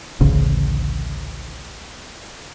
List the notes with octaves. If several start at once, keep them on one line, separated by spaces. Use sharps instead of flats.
A1 D2 C#3